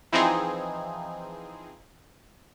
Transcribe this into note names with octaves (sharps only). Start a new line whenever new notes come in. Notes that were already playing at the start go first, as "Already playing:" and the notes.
E3 F3 C4 D#4 G#4